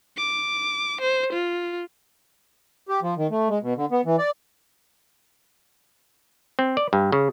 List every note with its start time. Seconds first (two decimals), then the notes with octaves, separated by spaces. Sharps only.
0.17 D6
1.01 C5
1.33 F4
2.89 G4
3.02 F3
3.17 D#3
3.31 A3
3.49 G#3
3.62 B2
3.77 D3
3.91 B3
4.05 E3
4.18 D5
6.59 C4
6.77 D5
6.93 G2
7.12 C#3